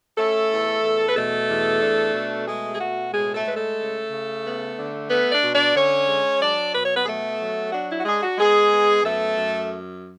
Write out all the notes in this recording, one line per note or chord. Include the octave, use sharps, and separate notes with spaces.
A3 C#4 A4
E2
E2
B4
B2 A3 A4
E2
D4
B2
G#3 A3 G#4
G#4
B2 F#4
A2 G#3 G#4
A3 A4
G#3 B4
A3 A4
C#3
C#3
B3
D3
A3 B3 B4
D4 D5
B2
D4 D5
D3 C#4 C#5
G#3
F#3 D4 D5
B2 B4
C#5
B3 B4
G#4
A3 B3 A4
F#3
D4 F#4
E4
F#4
G#3 D4 G#4
F#4
G#3 B3 G#4
B3
F#2 A3 A4
F#2